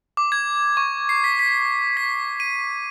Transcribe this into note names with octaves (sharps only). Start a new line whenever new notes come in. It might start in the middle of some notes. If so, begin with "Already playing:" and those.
D6
G#6
C#6
C7
B6
B6
B6
D#7